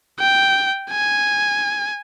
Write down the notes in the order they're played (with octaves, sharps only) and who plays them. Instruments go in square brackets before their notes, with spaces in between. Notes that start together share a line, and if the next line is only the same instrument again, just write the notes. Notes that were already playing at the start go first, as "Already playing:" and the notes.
[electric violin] G5
G#5